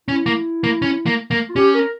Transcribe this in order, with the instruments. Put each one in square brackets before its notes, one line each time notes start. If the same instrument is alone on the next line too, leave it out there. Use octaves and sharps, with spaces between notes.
[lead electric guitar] C#4 [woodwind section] E4
[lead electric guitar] A#3
A#3
C#4
A#3
A#3
[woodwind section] F4
[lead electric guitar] C#4 [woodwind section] G4
[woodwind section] A#4